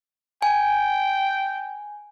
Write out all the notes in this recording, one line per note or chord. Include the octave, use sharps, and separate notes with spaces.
G5 G#5